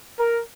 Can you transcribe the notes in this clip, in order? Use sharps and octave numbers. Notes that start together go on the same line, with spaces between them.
A#4